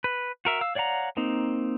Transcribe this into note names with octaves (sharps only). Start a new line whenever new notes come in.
B4
F#4 A#4 E5
F5 E6
C#5 D5 F5 F#5 A#5
A#3 C4 D#4